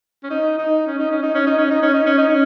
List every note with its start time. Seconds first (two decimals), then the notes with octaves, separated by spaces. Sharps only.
0.23 C#4
0.30 D#4
0.58 D#4
0.87 C#4
0.99 D#4
1.11 C#4
1.22 D#4
1.35 C#4
1.46 D#4
1.58 C#4
1.70 D#4
1.82 C#4
1.94 D#4
2.06 C#4
2.18 D#4
2.29 C#4